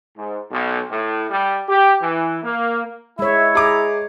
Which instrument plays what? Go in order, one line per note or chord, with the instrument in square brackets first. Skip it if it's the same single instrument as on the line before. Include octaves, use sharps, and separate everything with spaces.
[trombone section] G#2
B1
A2
G3
G4
E3
A#3
[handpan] G#3 C#5 [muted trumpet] E4 [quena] E5
[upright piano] G#4 D6 [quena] A#5